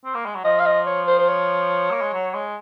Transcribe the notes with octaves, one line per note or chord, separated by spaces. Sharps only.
C4
A#3
G#3
F#3
F3 D#5
F5
D#5
C#5
C5
C5
C#5
A#3
G#3
F#3
G#3